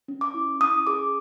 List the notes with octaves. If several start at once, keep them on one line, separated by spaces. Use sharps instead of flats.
C#4
D6
E4
C#4 D#6
G#4 D6